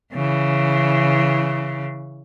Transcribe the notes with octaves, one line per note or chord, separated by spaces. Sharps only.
C#3 E3